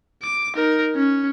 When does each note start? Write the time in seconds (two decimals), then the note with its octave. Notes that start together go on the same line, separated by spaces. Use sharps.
0.23 D6
0.55 D#4 A#4
0.95 C#4